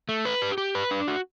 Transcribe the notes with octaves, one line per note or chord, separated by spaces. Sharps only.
A3
B4
G4
G4
B4
D4
F#4